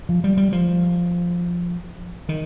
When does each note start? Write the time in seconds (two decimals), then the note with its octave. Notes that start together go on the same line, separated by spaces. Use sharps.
0.09 F3
0.24 G3
0.37 G3
0.52 F3
2.29 D#3